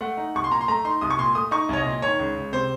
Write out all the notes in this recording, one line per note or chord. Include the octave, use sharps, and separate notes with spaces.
A3 F#5
D#4
C2 C#6
C6
A#2 A#5
C6
A3 A#5
D#4 C6
C2 D#6
C#6
A#2 C6
A3 D#6
D#4 C#6
C2 C#5
D#5
A#2
D#3 C#5
C#2
C#2
C3 C5